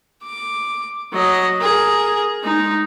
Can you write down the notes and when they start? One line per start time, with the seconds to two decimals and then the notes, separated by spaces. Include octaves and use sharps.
0.25 D6
1.13 F#3 D#5
1.60 G#4 A#4
2.43 G#3 D#4